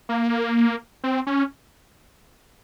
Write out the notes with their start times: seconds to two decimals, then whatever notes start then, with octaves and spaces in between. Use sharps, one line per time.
0.09 A#3
1.04 C4
1.27 C#4